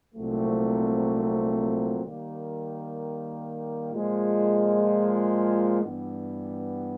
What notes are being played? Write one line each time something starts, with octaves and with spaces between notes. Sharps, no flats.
C2 A#2 F#3 A3 C4
D#3 G3 A#3
A#2 F3 G#3
G2 E3 G3 B3